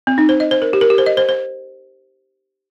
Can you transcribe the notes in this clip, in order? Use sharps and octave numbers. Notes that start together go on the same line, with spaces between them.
C4
D#4
C5
D#5
C5
A#4
G4
A#4
G4
C5
D#5
C5
C5